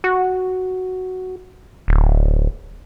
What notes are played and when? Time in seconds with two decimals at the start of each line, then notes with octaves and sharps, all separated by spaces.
0.04 F#4
1.88 D1